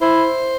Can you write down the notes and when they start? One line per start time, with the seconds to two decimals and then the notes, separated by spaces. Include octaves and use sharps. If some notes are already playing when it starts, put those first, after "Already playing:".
0.01 E4 C5